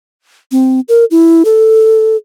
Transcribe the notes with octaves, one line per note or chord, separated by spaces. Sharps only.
C4
A#4
E4
A4